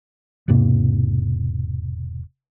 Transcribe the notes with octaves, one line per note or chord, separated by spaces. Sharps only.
E1 G#2 C3 A#3